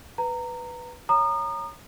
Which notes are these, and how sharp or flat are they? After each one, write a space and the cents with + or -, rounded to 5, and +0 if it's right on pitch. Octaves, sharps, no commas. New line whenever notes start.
B4 +0 A#5 -15
C#5 +0 A#5 -5 D#6 -35